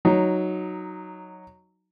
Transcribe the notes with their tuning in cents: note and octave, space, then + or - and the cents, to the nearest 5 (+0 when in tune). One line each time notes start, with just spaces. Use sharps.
F#3 +0 D#4 +0